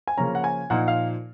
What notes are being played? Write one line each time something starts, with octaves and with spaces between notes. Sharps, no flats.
G#5
C#3 F3 A#3 C#4 A#5
F#5
G#5
A#2 F3 A#3 D#4 F#5
F5